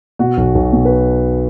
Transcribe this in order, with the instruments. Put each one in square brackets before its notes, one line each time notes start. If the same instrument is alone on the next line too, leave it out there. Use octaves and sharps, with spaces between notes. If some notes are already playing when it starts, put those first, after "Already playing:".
[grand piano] B2 F#4
B1
B1
B2
B4